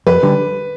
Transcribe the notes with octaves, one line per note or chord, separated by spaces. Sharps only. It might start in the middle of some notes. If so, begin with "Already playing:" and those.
F2 B4
D3 G3